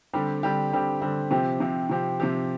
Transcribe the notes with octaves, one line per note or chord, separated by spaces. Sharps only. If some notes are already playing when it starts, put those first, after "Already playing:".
D3 G3 C4 G4
D3 G3 C4 G4
D3 G3 C4 G4
D3 G3 C4 G4
C3 F3 C4 G4
C3 F3 C4 G4
C3 F3 C4 G4
C3 F3 C4 G4